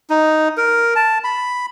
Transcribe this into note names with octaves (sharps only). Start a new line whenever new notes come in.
D#4
A#4
A5
B5